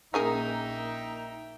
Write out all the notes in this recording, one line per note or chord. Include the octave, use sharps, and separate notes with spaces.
A#1 C#3 A#3 D#4 G#4 A#4 E5 G5